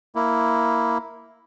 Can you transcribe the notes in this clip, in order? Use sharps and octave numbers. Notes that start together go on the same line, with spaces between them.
A#3 E4